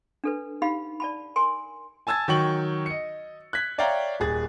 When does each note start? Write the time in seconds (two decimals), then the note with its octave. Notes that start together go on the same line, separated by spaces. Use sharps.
0.24 D4 A4 B4
0.62 D#4 G4 F5 B5
1.00 D5 A5 B5
1.36 A#4 G#5 C6
2.07 G#5 A5 E6 G#6 A6
2.28 D#3 F#3 G5 C#6 F#7
2.86 D#5 C#7
3.53 F#6 G#6 B6
3.78 C#5 D5 E5 F5 G5 A#5
4.20 D#1 G#4 A6